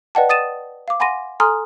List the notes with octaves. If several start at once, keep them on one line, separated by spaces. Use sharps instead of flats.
B4 D5 D#5 F#5 G5 A5
D#6 A6 D#7 E7
F5 D6
F#5 G#5 B5 C6 A#6 D#7
A4 G#5 A#5 C6 D#6 F6